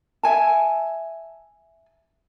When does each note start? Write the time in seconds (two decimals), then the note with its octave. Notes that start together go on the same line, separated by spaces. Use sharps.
0.23 E5 G#5 A5